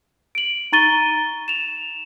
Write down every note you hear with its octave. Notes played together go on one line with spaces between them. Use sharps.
D7 F#7
D#4 A#5 C#6 A6 D#7 G7
E7 F7